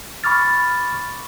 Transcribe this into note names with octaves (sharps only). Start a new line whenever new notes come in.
B5 C#6 D6 F6 A6